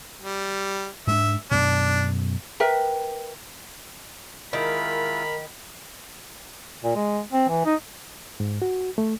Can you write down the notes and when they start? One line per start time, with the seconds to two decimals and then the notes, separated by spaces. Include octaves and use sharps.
0.22 G3
1.07 G#2 G#3 D4 E5
1.51 F#2 B2 D4
2.60 A#4 B4 E5 G5
4.53 D#3 G#3 E4 F4 A#4 B5
6.84 A#2
6.96 G#3
7.33 C4
7.49 E3
7.66 D#4
8.40 G#2
8.62 F#4
8.98 A3